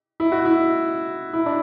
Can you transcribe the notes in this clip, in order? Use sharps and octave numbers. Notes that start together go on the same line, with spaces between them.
E4
F#4
E4
E4
D4